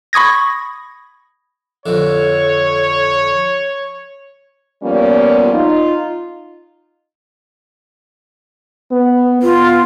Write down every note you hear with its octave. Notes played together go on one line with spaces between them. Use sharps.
B5 C#6 D#6 G#6 A#6
F2 D3 C#5
F3 G3 A#3 B3 C#4 F4
D#4 F4
B3
B3 F4